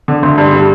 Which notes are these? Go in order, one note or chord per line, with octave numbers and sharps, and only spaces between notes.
D3
D2
G2
G3